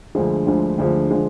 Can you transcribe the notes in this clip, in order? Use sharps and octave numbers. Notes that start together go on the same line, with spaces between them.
D2 D3 F3 G#3
D2 D3 F3 G#3
D2 D3 F3 G#3
D3 F3 G#3